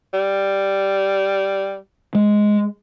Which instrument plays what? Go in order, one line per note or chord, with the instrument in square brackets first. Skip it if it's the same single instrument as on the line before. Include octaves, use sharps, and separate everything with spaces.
[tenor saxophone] G3
[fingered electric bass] G#3